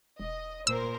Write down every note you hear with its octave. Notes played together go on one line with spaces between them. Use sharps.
E1 D#5
A#2 A#4 C5 E6